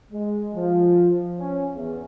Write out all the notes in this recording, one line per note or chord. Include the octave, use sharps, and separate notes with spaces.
G#3
F3
C#4
E2